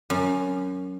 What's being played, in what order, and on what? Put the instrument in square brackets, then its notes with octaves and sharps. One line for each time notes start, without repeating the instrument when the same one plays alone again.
[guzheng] F#2